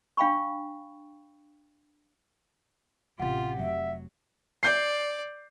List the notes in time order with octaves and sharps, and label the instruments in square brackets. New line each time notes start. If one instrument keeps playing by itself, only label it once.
[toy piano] D4 F5 G5 B5 C#6
[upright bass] A1 C3 [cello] F4 G4 [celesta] F#5
[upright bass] F1 [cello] F#3 [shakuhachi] E5
[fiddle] D5 [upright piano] G6 C7